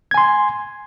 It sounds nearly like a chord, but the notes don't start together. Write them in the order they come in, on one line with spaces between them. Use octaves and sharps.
G#6 G#5 C6